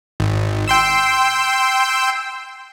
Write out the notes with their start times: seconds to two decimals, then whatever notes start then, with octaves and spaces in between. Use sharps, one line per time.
0.20 G#1
0.68 G5 C6 E6